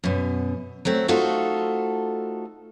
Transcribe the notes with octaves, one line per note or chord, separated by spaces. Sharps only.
F#2 B2
F#3 A3 C4
A3 D#4 F4 F#4 A4 C5